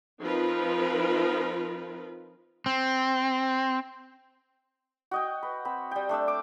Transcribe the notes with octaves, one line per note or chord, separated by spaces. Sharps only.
F3 C4 D#4 F4 A#4 B4
C4
F#4 D#5 G5
B4
C4 B5
G3 G5
A3 D4 D5 E6
D6